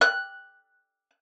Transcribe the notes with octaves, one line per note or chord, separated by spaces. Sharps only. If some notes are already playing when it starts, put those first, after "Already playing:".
F#6